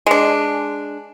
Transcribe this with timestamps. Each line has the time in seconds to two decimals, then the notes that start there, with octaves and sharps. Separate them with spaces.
0.06 G#3 D4